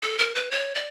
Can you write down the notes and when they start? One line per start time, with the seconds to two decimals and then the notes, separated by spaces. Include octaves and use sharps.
0.03 A4
0.19 A#4
0.35 B4
0.51 C#5
0.75 D5